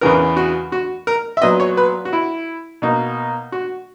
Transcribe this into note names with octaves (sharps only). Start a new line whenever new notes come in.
E2 C#3 E3 B3 A#4
F#4
F#4
A#4
E5
A#2 F#3 B3 D#5
C#5
B4
F#4
E4
B2 A#3 D#4
F#4